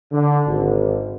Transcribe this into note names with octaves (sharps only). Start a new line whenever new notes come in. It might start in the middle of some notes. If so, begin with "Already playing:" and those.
D3
G#1